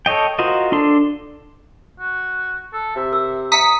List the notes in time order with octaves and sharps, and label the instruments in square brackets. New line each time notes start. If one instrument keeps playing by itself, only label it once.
[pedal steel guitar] A4 C#5 D#5 G5
F4 F#4 A#4 C5 D#5
D4 A4 C6
[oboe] F#4
A4
[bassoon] C3 [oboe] E5
[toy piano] A#4 E6
[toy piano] E5 A#5 [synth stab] D#6 B6 C#7